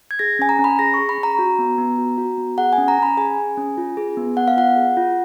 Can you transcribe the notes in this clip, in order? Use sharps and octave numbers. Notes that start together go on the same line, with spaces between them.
G#6
G#4 A#6
C#4 G#5
A#5
C#4
B5
G#4 A#6
G#4 C#6
B5
C#4
A#5
F#4
B3
B3
F#4
F#4
B3
G#4 F#5
G#5
C#4
A#5
C#4 B5
G#4 G#5
G#4
C#4
F4
G#4
B3
B3 F#5
F5
F4 F#5
G#4
F4